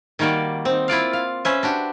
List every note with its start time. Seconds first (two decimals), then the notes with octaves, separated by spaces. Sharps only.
0.19 D#3 G3 A#3 F#4 D5
0.65 C4 D#4
0.88 E4 F4 D5 F5
1.13 F5
1.45 C#4 B4 C5 E5
1.63 D4 F#4 G4